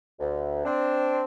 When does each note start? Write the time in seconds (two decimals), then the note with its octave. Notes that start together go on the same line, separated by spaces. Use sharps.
0.19 D2
0.65 C4 D4